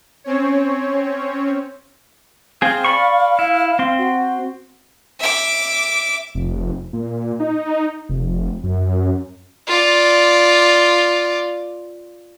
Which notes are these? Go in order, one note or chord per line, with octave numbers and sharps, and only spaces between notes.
C4 C#4 C#5
C4 G#4 F5
D5 B5 C#6
E4
C4 C6
F#4
E5 D6
F1
A#2
D#4
F1
F#2
F4 D5